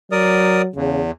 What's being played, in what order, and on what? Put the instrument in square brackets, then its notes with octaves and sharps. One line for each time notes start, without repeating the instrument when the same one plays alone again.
[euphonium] F#3 [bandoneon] A#4 D5 D#6
[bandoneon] E2 [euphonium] C#3